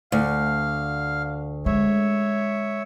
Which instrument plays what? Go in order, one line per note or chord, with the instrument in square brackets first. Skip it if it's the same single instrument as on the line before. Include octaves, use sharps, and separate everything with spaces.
[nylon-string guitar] D2 [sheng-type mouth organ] F5
[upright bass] G#3 [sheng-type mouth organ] C#5 E5